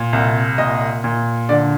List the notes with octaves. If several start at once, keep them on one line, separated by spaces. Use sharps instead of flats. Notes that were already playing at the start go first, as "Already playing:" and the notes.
Already playing: A#2
C2
A#2 D#5
A#2
D3 D5